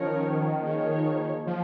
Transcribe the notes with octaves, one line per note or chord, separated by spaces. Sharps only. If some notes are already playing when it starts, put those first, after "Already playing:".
Already playing: D#3 F3 C#4 A#4 C#5
F3 A#3 D#4 G#4 C#5
F3